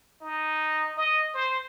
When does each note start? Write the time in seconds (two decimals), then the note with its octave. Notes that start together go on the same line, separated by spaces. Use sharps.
0.21 D#4
0.97 D#5
1.34 C5